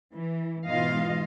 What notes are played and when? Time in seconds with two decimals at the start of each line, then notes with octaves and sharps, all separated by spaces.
0.13 E3
0.67 G#2 B2 E3 F4 D#5 F5